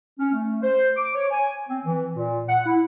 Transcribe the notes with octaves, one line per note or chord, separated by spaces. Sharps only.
C#4
A3
C5
D6
C#5
G#5
C4
E3
A#2
F#5
E4